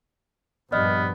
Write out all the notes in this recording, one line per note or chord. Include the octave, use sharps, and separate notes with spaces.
A#1 G2 B3 D5 D#5 F6